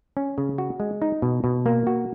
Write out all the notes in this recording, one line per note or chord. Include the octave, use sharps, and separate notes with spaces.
C#4
C#3
F#4
G#3
D#4
B2
B2
A#3
F#4